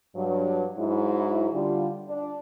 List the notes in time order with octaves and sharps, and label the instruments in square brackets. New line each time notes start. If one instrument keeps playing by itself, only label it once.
[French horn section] G2 F#3
G#2 F#3 G#3 E4
D3 G3 F4
D4